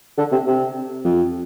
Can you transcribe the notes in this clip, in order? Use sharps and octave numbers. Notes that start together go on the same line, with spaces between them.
D3
C3
C3
F2